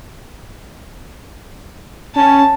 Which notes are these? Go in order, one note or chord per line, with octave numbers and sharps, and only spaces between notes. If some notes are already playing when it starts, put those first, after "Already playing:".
C#4 A5